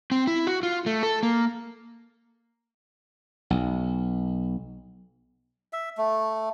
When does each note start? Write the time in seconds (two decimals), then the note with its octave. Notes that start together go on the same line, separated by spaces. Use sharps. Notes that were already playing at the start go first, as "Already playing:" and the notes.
0.11 C4
0.27 E4
0.47 F#4
0.63 F4
0.86 A3
1.03 A4
1.23 A#3
3.50 B1
5.73 E5
5.98 A3